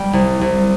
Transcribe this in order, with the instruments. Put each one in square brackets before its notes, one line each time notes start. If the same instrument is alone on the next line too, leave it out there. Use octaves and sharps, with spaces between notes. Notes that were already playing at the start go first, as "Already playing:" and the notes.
Already playing: [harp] G3 G5
C2
C2